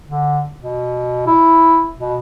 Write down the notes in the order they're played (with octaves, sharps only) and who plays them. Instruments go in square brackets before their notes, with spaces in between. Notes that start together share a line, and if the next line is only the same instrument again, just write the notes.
[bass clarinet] D3
B2
E4
B2